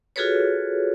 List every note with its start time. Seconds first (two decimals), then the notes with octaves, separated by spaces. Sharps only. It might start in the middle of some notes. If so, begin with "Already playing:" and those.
0.16 F4 F#4 G#4 A4 B4 C#5